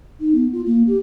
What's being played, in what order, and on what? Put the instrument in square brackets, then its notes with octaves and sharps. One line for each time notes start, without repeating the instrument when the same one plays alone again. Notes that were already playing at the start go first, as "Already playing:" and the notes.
[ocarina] D#4
B3
F4
A#3
G4